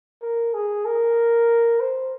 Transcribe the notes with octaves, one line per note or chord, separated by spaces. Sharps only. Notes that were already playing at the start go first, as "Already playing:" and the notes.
A#4
G#4
A#4
C5